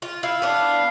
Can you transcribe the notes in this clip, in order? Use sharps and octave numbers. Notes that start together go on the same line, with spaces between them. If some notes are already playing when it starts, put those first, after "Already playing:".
F4
E4 F5
B3 D4